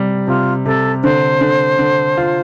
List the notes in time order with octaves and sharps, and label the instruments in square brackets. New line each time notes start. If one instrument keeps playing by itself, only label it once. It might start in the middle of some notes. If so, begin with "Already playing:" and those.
Already playing: [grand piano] C3 G3
[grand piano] C3 [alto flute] F4
[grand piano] C3 [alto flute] A4
[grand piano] D3 [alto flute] C5
[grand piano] D3
D3
F4